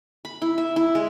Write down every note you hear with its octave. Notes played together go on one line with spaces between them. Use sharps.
B5
E4
E5
E4
G#3